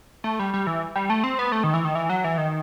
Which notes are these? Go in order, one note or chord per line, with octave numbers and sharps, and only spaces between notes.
A3
G3
G3
E3
G3
A3
C4
B3
A3
D#3
E3
D#3
E3
F#3
E3
D#3